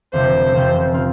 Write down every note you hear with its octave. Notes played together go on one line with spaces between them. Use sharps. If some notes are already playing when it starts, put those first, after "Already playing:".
F1 F2 D3 G3 C4 C5
F1 F2 D3 G3 C4
F3 C4 F4